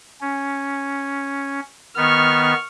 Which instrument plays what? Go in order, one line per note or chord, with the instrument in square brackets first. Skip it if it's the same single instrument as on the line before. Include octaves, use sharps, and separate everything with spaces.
[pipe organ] C#4
[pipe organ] D#3 B3 [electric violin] C#6 F6